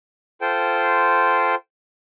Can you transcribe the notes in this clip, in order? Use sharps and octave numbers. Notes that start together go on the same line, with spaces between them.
F4 A4 C5 G5